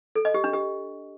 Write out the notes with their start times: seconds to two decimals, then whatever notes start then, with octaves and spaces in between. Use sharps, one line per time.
0.15 A4
0.25 D#5
0.34 G4
0.44 D4
0.53 G4